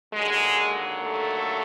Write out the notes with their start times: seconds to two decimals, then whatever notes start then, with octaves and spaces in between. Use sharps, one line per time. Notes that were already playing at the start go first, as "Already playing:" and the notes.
0.13 D#2 D3 F#3 G#3
1.01 A3